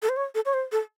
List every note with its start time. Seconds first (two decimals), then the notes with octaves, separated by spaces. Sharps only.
0.03 A4
0.09 C5
0.17 C#5
0.35 A4
0.45 C#5
0.54 C5
0.72 A4